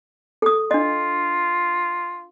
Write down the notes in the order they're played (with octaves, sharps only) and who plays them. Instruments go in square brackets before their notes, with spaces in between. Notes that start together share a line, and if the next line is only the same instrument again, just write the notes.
[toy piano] A4 D#6
[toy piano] D4 D#5 [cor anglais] F4